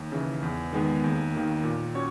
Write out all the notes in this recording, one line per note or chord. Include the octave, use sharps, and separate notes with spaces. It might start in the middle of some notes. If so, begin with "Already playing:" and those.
Already playing: D#2
C#3 E3
E2
D#3 G#3 B3
D#2
D#3 A#3
A#2
C#4 F#4 C#5